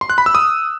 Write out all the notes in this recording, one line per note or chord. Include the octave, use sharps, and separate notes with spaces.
C6
F#6
B5
E6
D#6